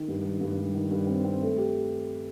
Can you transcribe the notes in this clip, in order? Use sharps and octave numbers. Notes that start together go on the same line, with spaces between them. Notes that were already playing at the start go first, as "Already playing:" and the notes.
Already playing: D#3
G2
D#3
G2
G3
D#3
G2
C4
C4
A3
G4